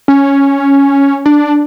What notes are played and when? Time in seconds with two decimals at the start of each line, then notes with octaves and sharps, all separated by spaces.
0.08 C#4
1.26 D4